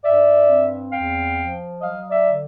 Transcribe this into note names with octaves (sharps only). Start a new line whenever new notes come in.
G2 D5 E5
C4
E2 F5 G5
F3
F#3 D#5 F5
D5 E5
D3